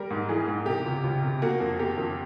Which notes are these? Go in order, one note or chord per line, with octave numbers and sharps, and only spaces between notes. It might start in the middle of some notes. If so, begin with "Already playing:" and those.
Already playing: G3 A#4
G#2
E3 G#4
G#2
C3 G4
C#2
C#2
C3
A#3 F#4
F2
A#3 G4
F2